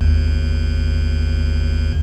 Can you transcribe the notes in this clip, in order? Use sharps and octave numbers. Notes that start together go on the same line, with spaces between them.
G1 D#2